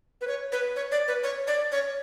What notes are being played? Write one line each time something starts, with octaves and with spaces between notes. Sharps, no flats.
B4
C#5
B4
C#5
D5
B4
C#5
D5
C#5